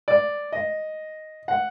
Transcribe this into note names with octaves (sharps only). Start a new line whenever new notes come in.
D5
D#5
F#5